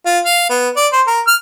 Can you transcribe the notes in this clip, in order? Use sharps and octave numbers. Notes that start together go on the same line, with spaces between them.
F4
F5
B3
D5
C5
A#4
F6